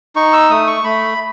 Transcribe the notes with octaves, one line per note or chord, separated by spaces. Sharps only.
D#4 C#6
E6
A3 D#6
C#6
A3 B5